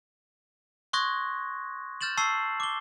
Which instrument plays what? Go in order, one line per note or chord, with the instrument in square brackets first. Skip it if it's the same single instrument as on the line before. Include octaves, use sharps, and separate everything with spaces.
[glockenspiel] C6 C#6 D#6 F#6 G#6 A#6
F6 G6 A6 E7 F#7
A5 C#6 E6 C7
D6 G7